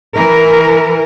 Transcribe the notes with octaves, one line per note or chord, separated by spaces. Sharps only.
E3 A#4